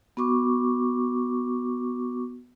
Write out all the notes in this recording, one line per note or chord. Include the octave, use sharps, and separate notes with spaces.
B3 F#4 C#6 D6